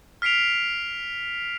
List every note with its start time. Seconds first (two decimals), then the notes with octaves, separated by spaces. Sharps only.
0.22 F6 B6 C7 D7 F7